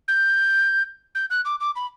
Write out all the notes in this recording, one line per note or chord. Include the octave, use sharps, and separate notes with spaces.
G6
G6
F#6
D6
D6
B5